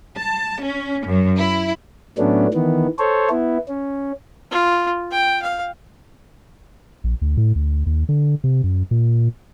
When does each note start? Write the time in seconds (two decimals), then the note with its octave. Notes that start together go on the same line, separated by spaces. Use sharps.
0.18 A5
0.62 C#4
1.06 F#2
1.39 E4
2.18 A2 F#3 A3 B3 C#4 D4
2.54 D#3 E3 B3
2.99 A4 C5 C#5
3.30 B3 E4
3.68 C#4
4.51 F4
5.11 G5
5.42 F5
7.04 A#1
7.22 D2
7.37 A2
7.55 D2
7.86 D#2
8.09 D3
8.44 C3
8.64 F#2
8.91 A#2